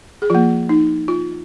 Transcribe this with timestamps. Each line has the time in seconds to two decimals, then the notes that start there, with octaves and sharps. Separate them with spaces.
0.22 G#4
0.30 F3 A#3 F4
0.69 D#4
1.08 F4